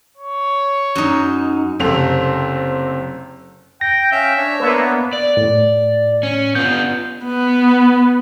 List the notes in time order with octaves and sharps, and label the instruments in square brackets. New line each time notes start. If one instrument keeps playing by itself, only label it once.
[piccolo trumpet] C#5
[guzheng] F#2 D#4
[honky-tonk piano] F#1 C3 A3 C4 F7
[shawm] G5 [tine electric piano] A#6
[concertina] C#4 F5 G5 [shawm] E5
[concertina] D4 C#5
[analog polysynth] A#3 B3
[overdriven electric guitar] D5
[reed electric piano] A2
[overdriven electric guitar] C#4
[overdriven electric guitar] B3 F4 [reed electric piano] G6
[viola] B3